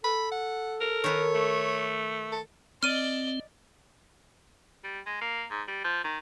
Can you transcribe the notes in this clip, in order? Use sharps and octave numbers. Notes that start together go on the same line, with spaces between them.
A4 B5
F#5
A#4
D#3 B4 C#5
A3
A4
C4 D5 D#5 F6 D#7
G3
G#3
A#3
G#2
G3
F3
D#3